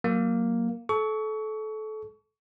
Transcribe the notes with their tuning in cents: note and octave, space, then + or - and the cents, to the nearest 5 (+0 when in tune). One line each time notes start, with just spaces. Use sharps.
F#3 +0 A#3 +0
A4 -25 C#6 +25